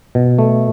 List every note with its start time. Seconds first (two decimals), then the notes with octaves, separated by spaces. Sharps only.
0.15 B2
0.39 A3